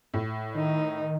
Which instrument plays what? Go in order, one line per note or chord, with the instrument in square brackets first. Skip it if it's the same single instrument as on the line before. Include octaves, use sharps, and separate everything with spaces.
[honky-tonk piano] A2
[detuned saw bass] D#3 [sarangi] D#4